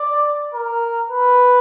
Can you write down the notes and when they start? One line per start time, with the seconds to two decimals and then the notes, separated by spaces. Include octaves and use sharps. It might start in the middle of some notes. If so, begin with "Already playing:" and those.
Already playing: D5
0.54 A#4
1.09 B4